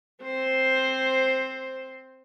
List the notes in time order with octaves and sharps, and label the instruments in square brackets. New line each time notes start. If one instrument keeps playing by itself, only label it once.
[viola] C4 C5